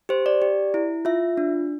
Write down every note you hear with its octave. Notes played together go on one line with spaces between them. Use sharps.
G4 C5
D5
G4
E4
F4 E5
D4